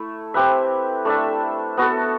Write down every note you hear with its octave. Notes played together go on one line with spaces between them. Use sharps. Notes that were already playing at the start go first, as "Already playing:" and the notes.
Already playing: A3 E4
C4 G4 B4 E5
A3 D4 A4 E5
B3 F#4 A4